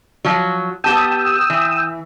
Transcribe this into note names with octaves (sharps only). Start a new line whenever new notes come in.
F3 F#3
B3 G4 G5 A5 D#6 E6
E3